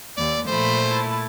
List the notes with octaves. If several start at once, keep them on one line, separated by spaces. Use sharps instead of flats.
D#2 D5
A#2 F3 A3 C5 B5
E4 A5